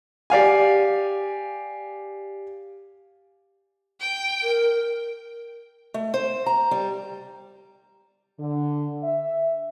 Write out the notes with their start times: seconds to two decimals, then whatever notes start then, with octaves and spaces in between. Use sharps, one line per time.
0.30 G4 D5 F5 G#5
4.01 G5
4.43 A#4
5.94 A3
6.14 C5
6.46 A#5
6.71 G3
8.39 D3
9.03 E5